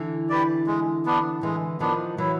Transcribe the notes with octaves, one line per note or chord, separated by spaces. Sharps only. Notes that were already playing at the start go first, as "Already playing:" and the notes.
Already playing: D3 E3
G4 B4 D5
G#3
B3 D4
D3 E3 G#3
D#3 F3 B3 D4
E3 F#3 E4